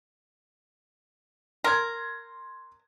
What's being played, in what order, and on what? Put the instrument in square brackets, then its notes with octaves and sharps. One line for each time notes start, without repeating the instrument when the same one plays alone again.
[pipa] A#4 [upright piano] C6 G#6